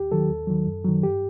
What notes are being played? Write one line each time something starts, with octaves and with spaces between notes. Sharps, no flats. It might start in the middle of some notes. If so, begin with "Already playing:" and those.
Already playing: D#2 G4
D#3 F#3 A4
D#2
D#3 F#3
F#2
D#3 F#3
G2 G4